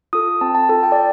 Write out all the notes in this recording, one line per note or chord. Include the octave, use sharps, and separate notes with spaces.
F4 A4 D#6
C4 A5
A5
F4 A4 A5
G5
D5